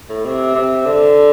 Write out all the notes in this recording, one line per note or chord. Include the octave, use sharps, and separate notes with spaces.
A2
C3
C3
D3